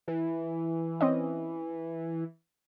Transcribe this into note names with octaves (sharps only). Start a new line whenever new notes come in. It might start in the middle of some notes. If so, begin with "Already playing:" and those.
E3
C4 C#4 D#5